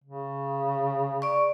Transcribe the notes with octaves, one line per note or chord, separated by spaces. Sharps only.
C#3
D5 C#6